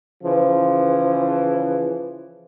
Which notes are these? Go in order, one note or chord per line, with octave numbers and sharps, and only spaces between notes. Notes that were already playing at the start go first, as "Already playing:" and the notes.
C#3 E3 F3